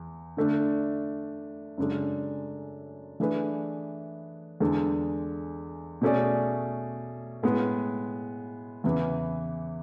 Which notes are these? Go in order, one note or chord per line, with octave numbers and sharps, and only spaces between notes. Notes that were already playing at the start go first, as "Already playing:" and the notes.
Already playing: E2
D3 A3 D4
F#2 C#3 G#3 D4 A4
E3 A3 D4 G#4 B4
E2 D3 G#3 D4 A4
B2 A3 C#4 G#4 D5
A2 G#3 B3
E2 C#3 E3 B3